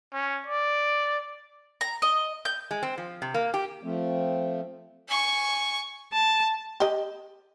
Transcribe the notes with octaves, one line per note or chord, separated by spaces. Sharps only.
C#4
D5
A#5
D#5
G6
G#3
C4
F3
C3
A#3
G4
F3 A3 C4
G#5 C#6
A5
G4 D#5